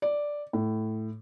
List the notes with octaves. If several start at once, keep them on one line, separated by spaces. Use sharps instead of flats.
D5
A2